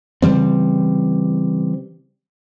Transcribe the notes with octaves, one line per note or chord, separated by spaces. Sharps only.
C#3 E3 G3 C4